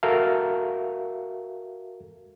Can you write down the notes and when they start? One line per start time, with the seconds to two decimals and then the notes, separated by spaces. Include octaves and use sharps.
0.03 F#4 A4 A#4 E5 F5